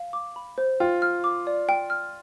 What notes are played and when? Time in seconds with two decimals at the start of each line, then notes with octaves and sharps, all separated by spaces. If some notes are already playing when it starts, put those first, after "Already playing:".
Already playing: F5
0.13 D6
0.36 B5
0.58 C5
0.80 F4 G5
1.02 F6
1.24 D6
1.47 D5
1.69 G5
1.90 F6